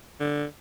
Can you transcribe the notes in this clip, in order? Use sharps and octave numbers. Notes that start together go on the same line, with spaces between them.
D3